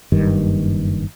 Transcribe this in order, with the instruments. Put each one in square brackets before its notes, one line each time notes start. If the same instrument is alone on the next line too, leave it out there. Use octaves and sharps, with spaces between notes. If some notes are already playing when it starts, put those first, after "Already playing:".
[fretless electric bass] F#1 G2 D#3